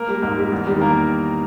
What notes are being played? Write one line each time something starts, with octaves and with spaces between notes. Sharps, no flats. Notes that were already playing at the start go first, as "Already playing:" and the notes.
Already playing: A#3 A#4
G3
G#2 A#3 A#4
G3
E2
D#3 G3
A#3 A#4